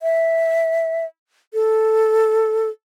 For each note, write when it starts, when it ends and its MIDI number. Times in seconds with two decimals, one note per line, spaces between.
0.02 1.05 76
1.54 2.69 69